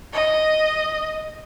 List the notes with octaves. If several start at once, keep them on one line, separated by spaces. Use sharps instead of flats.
D#5